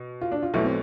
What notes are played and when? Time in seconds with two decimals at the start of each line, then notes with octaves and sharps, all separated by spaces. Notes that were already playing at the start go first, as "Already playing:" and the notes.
Already playing: B2
0.21 F4
0.32 D4
0.43 F4
0.54 B1 B2 A3 E4
0.64 C4